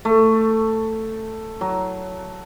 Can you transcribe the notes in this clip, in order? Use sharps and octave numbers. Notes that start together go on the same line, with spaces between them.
A3
F#3